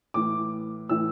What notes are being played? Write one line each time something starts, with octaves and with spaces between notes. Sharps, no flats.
A2 E3 D6
A2 E3 E6